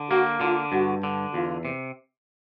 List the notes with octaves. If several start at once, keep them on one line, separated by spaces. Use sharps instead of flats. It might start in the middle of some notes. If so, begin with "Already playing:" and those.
Already playing: D3
A#3 F#4
D3 F4
G2 F#4
D3
E2 F4
C3